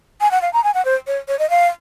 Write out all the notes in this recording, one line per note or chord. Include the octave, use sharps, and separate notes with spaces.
G#5
F#5
F5
A#5
G#5
F#5
C5
C#5
C#5
D#5
F5